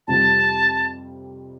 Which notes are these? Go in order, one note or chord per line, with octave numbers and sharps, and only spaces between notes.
F2 C3 G3 C4 F4 A5